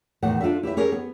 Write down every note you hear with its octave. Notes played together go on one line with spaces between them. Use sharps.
E2 A2 D#3 F#5
D4 F4 F#4 A4 E5
E4 G4 B4 E5
C#4 G4 G#4 A#4
B3